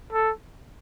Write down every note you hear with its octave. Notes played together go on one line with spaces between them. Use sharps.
A4